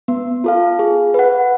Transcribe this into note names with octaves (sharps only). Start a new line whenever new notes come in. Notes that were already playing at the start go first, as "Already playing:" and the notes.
B3
F4 A4 F5
G#4
B4 F#5